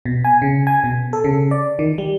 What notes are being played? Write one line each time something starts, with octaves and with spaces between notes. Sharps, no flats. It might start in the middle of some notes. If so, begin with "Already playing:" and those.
B2
G#5
C#3
G#5
B2
A4
C#3
D5
D#3
G3